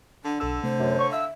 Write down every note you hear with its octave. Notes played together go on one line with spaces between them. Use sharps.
D3 D4
B1 D3 A4 E6
C3 A3 C5
F#2
C#5 C#6
E5 F5 E6